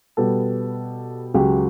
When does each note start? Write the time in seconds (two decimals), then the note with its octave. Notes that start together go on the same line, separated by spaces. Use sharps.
0.17 B2 G3 B3 A4
1.34 C#2 C#3 F#3 G4